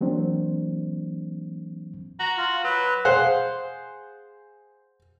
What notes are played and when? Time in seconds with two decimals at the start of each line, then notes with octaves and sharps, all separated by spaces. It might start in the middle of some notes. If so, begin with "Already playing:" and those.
0.01 E3 F#3 A#3 C4 D4
2.20 F#4 A#5
2.38 F4
2.64 F#3 B4
3.05 G#4 C5 F5 F#5